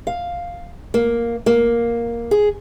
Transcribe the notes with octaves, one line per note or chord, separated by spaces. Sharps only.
F5
A#3
A#3
G#4